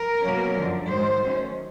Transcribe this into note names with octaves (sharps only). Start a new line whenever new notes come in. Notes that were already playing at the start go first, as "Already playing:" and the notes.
Already playing: A#4
B2 F#3 A#3 C#4
F#2 D3 F3
G#2 D#3 F#3 C5
D#3 F#3 A3 C#4